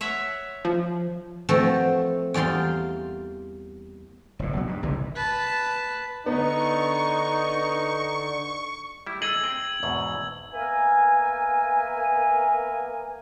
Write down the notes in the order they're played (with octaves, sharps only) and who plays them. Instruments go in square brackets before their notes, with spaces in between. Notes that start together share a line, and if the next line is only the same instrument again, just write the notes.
[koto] C#5 E5 F#5
[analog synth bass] F3
[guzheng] F3 A3 C4 F#4 A4 B4
E2 G3 A#3 F4 C6
[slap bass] F#1 A2
B1 F#3
G2
G1 C2 C3 E3
[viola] B4 A5
[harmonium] D3 [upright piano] B3 [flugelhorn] D#4 [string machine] C#6
[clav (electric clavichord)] G3 E4
[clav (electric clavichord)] G#4 A4 D#5 [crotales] E6 G#6 F#7
[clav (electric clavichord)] C4 G5
E2 G#2 B2
[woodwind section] A#3 B3 A#4 E5 G#5